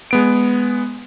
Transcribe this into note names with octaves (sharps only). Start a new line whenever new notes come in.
G#3 B3 D7